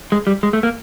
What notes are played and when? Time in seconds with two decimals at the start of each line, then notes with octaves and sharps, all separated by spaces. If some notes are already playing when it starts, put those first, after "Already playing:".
0.12 G#3
0.27 G3
0.43 G#3
0.53 A3
0.63 A#3